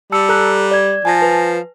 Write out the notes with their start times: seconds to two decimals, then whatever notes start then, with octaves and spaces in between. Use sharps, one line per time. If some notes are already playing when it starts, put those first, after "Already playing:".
0.12 G3 A5 E6 C#7
0.29 A4 A#5 F#6
0.71 D5 G#6
1.05 F3 G#5 A5 A#6
1.22 B4